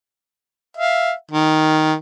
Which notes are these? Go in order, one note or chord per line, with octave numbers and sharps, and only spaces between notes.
E5 F5
D#3